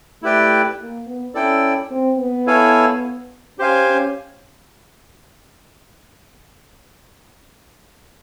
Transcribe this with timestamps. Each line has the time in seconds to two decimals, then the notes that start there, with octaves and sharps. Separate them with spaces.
0.22 A3 E4 G4 B4 D5 G5
0.79 A#3
1.07 B3
1.35 C#4 E4 A4 D5 G5
1.91 C4
2.19 B3
2.46 E4 A4 C#5 F5 G#5
3.58 C#4 G4 C5 F5 G#5
3.86 C#4